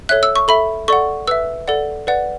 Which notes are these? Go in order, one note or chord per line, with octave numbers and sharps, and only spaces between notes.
A4 C#5 E5 F#6
E6
C#6
A4 E5 B5
A4 D5 F#5 C#6
B4 E5 E6
A4 D5 F#5
B4 D5 F#5